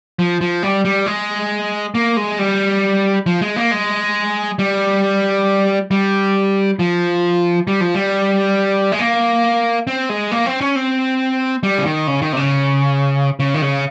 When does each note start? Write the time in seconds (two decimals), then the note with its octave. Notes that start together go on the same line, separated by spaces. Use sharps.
0.19 F3
0.41 F3
0.63 G3
0.85 G3
1.06 G#3
1.95 A#3
2.17 G#3
2.39 G3
3.26 F3
3.41 G#3
3.56 A#3
3.71 G#3
4.59 G3
5.91 G3
6.79 F3
7.67 G3
7.81 F3
7.95 G3
8.92 G#3
8.99 A#3
9.87 C4
10.09 G#3
10.32 A#3
10.46 C4
10.61 C#4
10.76 C4
11.63 G3
11.78 C#3
11.85 D#3
12.07 C#3
12.22 D#3
12.33 C3
12.37 C#3
13.40 C#3
13.54 D#3
13.62 C#3